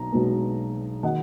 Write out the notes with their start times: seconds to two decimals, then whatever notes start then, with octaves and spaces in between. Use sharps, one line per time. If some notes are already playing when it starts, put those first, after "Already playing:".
Already playing: B1 B2 A#5
0.12 B1 B2 G#3 B3
1.03 D#3 F#3 D#5 F#5